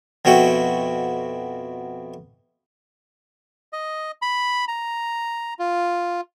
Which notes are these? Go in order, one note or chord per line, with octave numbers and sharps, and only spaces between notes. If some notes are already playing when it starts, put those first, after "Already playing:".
F2 B2 E4 F#4 G5
D#5
B5
A#5
F4